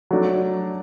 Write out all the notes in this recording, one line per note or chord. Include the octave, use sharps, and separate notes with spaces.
F#3 A3 D4